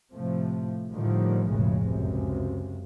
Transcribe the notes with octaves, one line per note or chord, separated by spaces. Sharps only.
A2 C3 F3 A3
A2 D3 D#3 F3 G3
F1 B1 F2 A2 C#3 G#3
C#2 F#2 C3